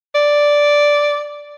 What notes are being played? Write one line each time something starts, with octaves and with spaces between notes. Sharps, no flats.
D5